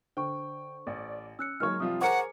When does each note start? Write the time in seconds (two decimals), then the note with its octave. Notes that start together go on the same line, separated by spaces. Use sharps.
0.17 D3 C5 G5 C#6
0.87 A1 D5
1.39 C#4 E6 F#6 C#7
1.60 F#3 G#3 A#3 D#4 C#5 C#6 F6
1.80 C3 F3 G3 F4 D#6
2.01 G#4 A#4 C5 C#5 F#5 A#5 D6 C#7